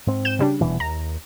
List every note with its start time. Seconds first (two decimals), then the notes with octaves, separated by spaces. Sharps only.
0.07 G#2 C4
0.25 G6 E7
0.39 C#3 G3 D4
0.61 D#1 B2 E3
0.80 D#2 A#5